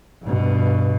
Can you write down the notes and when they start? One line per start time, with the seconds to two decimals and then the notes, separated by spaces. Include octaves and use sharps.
0.23 G2 B2